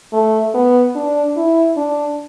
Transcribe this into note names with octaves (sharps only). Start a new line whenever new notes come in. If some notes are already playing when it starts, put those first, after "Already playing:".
A3
B3
D4
E4
D4